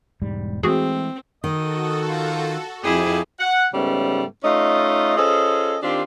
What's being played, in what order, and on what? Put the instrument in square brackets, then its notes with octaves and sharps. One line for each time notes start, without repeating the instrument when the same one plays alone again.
[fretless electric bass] E1 G#2 G3
[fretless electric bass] E3 G#3 A3 [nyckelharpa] C4 [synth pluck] F#4 G#4
[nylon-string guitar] D#3 [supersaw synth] F#4 A4 [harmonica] D#5
[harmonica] F3 F4
[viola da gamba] F2 E4 G#4 [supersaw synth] F3 C4 [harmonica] G4 D#5
[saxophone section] F#5
G#2 C#3 G3 A3 B3 C#4
A3 C#4 D#4 F4 D#5
C#4 F4 G#4 A4 C5 D#5
D#3 C4 D4 F4 G4